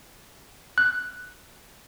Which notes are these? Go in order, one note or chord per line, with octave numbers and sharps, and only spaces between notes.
F#6